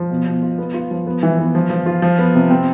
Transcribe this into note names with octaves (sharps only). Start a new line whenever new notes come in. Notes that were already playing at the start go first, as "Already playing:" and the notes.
Already playing: F3
B2
B2
F4
B3
F4
F3
B3
E3
B3
F3
F3
F4
F3
B3
C3
C4